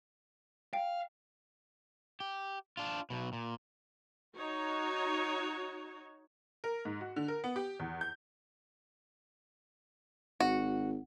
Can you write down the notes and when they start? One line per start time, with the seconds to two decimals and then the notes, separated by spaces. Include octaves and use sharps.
0.73 F5 G5
2.20 G4
2.77 D4 F4
3.10 B1 B2
3.33 A#2
4.37 D#4 F#4 C#5
6.64 A#4
6.85 G#2
7.01 F#4
7.16 D3
7.28 A#4
7.44 B3
7.56 G4
7.80 E2
8.01 G6
10.40 G#1 F#4